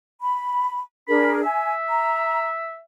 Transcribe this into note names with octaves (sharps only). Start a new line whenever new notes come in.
B5
D4 G#4 A#4 B5
E5 G#5
A#5